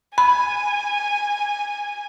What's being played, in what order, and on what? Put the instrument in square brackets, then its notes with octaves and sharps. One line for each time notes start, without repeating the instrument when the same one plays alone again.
[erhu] G#5 [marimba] B5